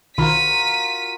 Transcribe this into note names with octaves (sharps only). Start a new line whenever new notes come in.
B1 D#3 F4 F#4 A#4 B5 B6 D#7